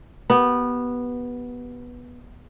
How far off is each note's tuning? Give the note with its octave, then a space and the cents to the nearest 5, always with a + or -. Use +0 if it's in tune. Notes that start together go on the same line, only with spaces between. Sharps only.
B3 -10 G4 -30